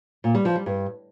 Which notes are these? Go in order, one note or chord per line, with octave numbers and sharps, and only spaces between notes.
A#2
G3
F3
G3
G2